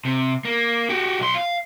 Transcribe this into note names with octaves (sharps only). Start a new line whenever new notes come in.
C3
A#3
F#4 G4
B1 C6
F5